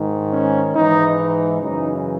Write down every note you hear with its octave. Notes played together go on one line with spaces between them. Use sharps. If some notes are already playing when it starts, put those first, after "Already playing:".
Already playing: G#2 D#3
C#4
G#2 E3 D#4
D#4
F#2 C#3 E3 D#4